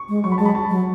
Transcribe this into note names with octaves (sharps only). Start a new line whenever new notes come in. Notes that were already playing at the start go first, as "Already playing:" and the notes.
Already playing: C#6
G#3
F#3 C#6
B5
G#3 A5
B5
A5
F#3